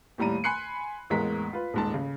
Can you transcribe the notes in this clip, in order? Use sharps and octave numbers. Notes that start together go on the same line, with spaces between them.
D#2 A2 G3 A#5 D#7
G#5 B5 C6 F#6 C7 C#7
A1 E2 G#3 A#3 A#5 B6
F4 B4
D#1 G#2 A5
C#3